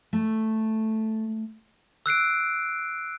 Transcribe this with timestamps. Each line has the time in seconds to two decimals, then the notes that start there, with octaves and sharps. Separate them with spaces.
0.13 A3
2.06 E6 F#6 C7 D7